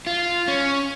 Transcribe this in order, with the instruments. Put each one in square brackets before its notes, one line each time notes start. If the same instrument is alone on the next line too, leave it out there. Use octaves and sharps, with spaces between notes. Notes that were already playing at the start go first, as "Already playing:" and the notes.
[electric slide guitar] F4
C#4